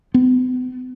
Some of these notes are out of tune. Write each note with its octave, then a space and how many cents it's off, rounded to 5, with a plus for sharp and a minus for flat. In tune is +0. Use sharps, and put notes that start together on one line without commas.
B3 +45